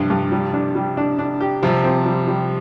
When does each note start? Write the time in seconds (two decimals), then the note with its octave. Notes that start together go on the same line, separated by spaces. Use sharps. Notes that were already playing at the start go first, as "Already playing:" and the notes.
Already playing: G2 C3 F3 D4
0.10 G2
0.32 G3
0.53 D4
0.75 G3
0.97 D4
1.19 D4
1.40 G4
1.62 C3 F3 G3
1.84 C4
2.06 G3
2.27 G3